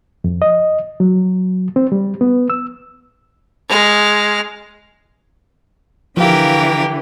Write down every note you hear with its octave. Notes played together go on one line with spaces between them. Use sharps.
F2
D#5
F#3
C4
G3
B3
E6
G#3 F6
D3 E3 F3 G4 A#4 F5